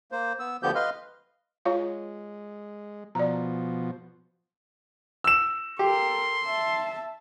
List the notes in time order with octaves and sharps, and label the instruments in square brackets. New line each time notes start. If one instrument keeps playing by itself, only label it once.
[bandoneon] A#3 C5
B3 E6
D2 D3 F3 B3 G4 G6
B4 D#5 F5 C6 F6
[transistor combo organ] G#3 [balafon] F4 C#5 F5
[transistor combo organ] B2 F3 [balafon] D5 A#5
[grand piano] E6 E7
[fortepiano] G4 [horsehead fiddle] A4 A#4 [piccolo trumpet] C6
[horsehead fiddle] E5 A5